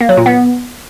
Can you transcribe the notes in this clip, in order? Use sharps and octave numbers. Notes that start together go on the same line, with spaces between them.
A#3
F#3
A#2
B3